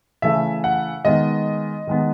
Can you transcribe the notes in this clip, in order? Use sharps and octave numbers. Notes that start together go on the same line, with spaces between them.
C#3 E3 A3 E5
F#5
D#3 G#3 B3 D#5
D#3 G#3 B3